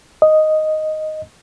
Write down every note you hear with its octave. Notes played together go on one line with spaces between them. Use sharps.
D#5